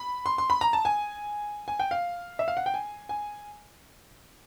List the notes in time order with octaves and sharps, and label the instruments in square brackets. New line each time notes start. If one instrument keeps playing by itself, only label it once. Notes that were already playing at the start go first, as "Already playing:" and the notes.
Already playing: [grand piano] B5
C6
C6
B5
A#5
A5
G#5
G#5
G5
F5
E5
F5
F#5
G5
G#5
G#5